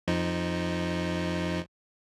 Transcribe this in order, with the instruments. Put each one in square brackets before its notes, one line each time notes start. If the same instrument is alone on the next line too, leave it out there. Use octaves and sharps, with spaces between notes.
[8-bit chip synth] F2 F3 D#4